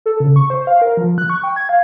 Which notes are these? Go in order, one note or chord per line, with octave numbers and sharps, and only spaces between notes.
A4
C#3
C#6
C5
F5
A#4
F3
F#6
C#6
G5
G#6
F5